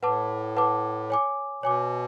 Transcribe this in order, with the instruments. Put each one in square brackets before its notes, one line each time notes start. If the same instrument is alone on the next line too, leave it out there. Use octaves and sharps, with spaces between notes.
[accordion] A2 [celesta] B4 F#5 A5 D6
[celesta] B4 F#5 A5 D6
C#5 G#5 D6
[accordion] B2 [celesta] C#5 G#5 D6